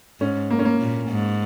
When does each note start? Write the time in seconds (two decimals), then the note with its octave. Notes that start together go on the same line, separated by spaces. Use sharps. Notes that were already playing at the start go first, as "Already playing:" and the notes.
0.20 G#2 C#4
0.50 A#3
0.59 C#4
0.65 A#3
0.80 A#2
1.09 G#2